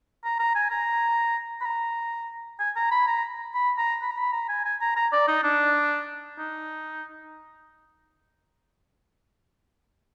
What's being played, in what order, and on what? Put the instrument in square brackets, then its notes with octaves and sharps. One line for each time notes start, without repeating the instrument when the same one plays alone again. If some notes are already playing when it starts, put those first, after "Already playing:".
[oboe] A#5
A#5
G#5
A#5
B5
A#5
G#5
A#5
B5
A#5
B5
A#5
B5
A#5
B5
A#5
G#5
G#5
A#5
A#5
D5
D#4
D4
D#4